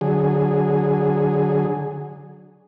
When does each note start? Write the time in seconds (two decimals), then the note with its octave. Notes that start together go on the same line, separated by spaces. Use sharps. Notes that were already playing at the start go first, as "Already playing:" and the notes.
0.01 D3 F#3 G#4